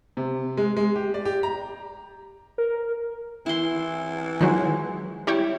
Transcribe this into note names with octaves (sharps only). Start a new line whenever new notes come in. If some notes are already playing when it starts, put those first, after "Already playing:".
C3
G#3
G#3
G4
D5
G4
A#5
A#4
E3 E4 C6
D#3 F3 F#3 G#3
G3 E4 C#5 G5